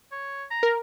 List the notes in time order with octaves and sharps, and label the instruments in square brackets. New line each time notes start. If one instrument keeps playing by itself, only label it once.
[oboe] C#5
A#5
[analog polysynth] A#4